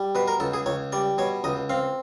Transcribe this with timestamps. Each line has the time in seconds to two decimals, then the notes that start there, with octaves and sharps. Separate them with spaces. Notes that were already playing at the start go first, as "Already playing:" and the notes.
Already playing: G3
0.15 B2 B4
0.28 A#4
0.40 C#2 A4
0.54 G#4
0.66 C#2 C#5
0.92 G3 D5
1.18 B2 C#5
1.44 C#2 D#5
1.70 C4 F5